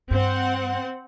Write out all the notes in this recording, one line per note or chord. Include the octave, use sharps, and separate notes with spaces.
G2 C4 F#5